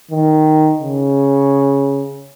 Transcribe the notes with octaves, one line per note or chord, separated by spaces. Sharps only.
D#3
C#3